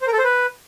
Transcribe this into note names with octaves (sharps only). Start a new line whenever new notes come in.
C5
A#4
A4
C5
B4